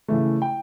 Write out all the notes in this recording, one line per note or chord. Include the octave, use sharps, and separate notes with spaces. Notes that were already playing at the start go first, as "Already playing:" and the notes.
C#3 E3 A3
G5